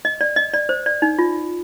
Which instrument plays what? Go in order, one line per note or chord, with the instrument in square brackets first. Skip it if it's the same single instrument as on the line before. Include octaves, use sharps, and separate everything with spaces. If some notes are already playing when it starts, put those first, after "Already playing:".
[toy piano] D#5
D5
D#5
D5
C5
D5
D#4
F4